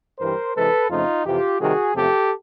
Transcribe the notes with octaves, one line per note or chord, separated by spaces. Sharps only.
G2 E3 G3 A#4 C5
C3 E3 G#3 A4 B4
F2 C#3 F3 A3 D#4 F4
F2 C3 E3 F4 G4
C3 D#3 G3 F#4 G#4
E2 C3 F3 A3 G4 A4